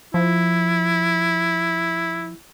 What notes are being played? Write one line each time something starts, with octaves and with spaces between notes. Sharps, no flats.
F3 E4